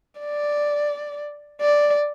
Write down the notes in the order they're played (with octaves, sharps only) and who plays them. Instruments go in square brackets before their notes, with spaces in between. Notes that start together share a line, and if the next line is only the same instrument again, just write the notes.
[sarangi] D5
D5